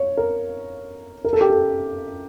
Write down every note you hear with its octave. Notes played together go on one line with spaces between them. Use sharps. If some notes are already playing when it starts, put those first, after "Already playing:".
Already playing: C#5
A#4
A#4
A4
G4
A4